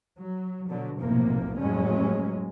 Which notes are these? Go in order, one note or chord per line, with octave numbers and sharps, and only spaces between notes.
F#3
B2 D3 F#3
F1 B1 A2 C3 F3 A#3
F#1 F2 A2 F#3 G#3 C#4